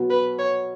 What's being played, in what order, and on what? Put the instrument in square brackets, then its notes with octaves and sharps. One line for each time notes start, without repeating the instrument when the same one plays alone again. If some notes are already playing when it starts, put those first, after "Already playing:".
Already playing: [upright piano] B2 F#3 B3
[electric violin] B4
C#5